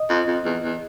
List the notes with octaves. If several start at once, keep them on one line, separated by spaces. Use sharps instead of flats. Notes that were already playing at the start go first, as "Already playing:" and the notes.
Already playing: D#5
F2
F2
E2
E2